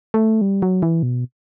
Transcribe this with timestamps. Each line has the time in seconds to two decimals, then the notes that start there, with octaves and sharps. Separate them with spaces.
0.14 A3
0.41 G3
0.62 F#3
0.82 E3
1.03 B2